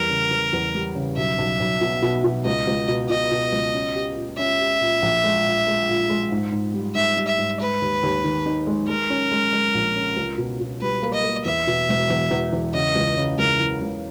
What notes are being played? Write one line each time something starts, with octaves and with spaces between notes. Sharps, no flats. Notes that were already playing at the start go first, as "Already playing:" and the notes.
Already playing: E2 G3 A#4
C#3
E2
E2
G3
C#3
B1 E5
B1
B1
B2
B2
B2
C#2 D#5
C#2
B2
B2 D#5
B2
C#2
C#4
G4
A#2
C#4 E5
G4
A#2
A#1
G#3
A#2
G#3
A#2
G#3
G#2
G#2
G3
G#2 E5
G3
E5
G#2
G#3 B4
D#2
D#2
D#3
D#4
G#3
G#3 A#4
C#4
G#3
G#3
A#1
C#4
C#2
B2
B2
G3 B4
A#3
D#5
A#3
E2 E5
B2
E1
E2
E2
E2
C#3 D#5
C#2
C#3
C#2 A#4
E3
C#2